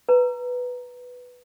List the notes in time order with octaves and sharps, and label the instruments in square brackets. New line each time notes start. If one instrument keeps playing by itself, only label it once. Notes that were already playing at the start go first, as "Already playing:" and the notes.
[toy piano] B4 A#5